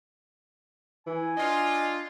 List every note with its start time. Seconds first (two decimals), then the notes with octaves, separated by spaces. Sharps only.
1.07 E3 G#5
1.37 D4 F4 D#5